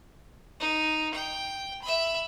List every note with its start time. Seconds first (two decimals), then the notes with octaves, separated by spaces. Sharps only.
0.60 D#4
1.14 G5
1.82 E5 B5